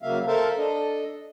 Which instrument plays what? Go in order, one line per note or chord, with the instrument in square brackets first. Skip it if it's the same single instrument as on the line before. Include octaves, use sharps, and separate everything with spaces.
[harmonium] C#3 F#3 A#3 E5 F5
A4 A#4 C5 E5 F5 A5
D4 A4 D#5